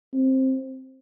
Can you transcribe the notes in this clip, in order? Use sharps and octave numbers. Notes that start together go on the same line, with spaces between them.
C4